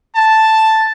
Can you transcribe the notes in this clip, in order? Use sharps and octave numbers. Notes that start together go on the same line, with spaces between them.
A5